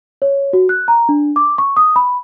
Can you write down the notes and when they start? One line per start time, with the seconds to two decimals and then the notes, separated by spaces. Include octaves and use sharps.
0.22 C#5
0.53 F#4
0.69 F#6
0.88 A#5
1.09 D4
1.36 D6
1.58 C#6
1.77 D#6
1.96 B5